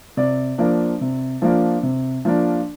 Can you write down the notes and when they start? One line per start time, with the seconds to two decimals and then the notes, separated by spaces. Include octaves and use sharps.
0.17 C3 D5
0.58 F3 A#3 D4
1.01 C3
1.42 F3 A#3 D4
1.83 C3
2.25 F3 A#3 D4